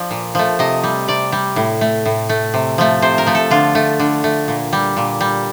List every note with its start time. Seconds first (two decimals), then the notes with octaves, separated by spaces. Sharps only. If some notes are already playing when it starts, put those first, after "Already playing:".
Already playing: F3 D5
0.11 A#2
0.35 F3 A3
0.59 C3 D#5
0.84 G3
1.08 C3 D5
1.32 G3
1.56 A2
1.81 A3
2.05 A2
2.29 A3
2.54 C3
2.78 F3 A3
3.02 C3 C5
3.18 A#4
3.27 F3 A3
3.35 A4
3.51 D3 F4
3.75 A3
3.99 D3
4.24 A3
4.48 A#2
4.73 G3
4.97 A#2
5.21 G3